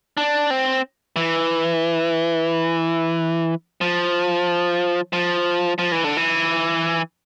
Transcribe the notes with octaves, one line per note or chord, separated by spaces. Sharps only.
D4
C4
E3
F3
F3
F3
E3
D3
E3